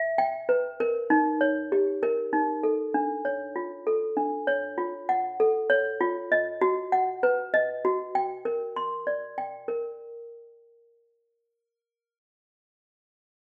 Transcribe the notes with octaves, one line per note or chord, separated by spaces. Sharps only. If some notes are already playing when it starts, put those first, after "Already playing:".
Already playing: E5
G5
B4
A#4
D#4
C#5
G4
A#4
D#4
A4
D4
C#5
F4
A4
D4
C#5
F4
F#5
A4
C#5
F4
D#5
F#4
F#5
B4
D#5
F#4
G5
A#4
C6
D5
G5
A#4